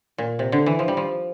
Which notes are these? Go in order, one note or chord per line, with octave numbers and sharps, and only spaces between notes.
A#2
C3
D3
E3
F3
G3
F3